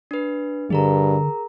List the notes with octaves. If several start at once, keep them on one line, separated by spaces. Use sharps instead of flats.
D4 B4
G2 D3 G#4 A#4 A#5